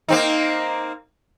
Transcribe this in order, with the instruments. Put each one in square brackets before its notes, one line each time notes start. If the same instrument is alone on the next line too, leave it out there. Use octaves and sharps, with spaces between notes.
[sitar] A#3 C4 D#4